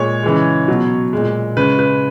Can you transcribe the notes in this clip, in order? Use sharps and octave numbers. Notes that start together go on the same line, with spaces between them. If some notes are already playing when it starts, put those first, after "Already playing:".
Already playing: A#2 G#3 C#5
C#3 E3 G#3
B2 F#3
A#2 G#3
C#3 G#3 B4
B4